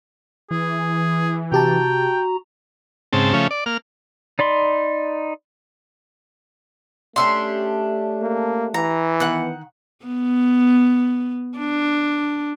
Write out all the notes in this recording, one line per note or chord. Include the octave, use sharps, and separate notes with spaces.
E3 G#4
C3 F#4 G4 G5 A5 A#5
G#2 C#3 C4 A5
C#3 F3 A3 C#4
D5
A#3 F6
D#4 D5 B5 C6
A3 C#4 D4 G4 E5 C6
A#3
E3 A#5
D#3 B3 F#5 F#6
B3
D4